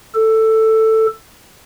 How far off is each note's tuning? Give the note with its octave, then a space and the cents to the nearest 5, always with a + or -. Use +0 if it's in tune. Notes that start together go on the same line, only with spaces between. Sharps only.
A4 +10